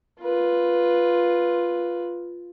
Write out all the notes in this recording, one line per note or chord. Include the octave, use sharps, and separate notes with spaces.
F4 B4